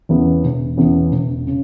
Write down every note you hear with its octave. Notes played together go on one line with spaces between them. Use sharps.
E2 C#3 E3 B3
E1
E2 C#3 E3 B3
E1
C#3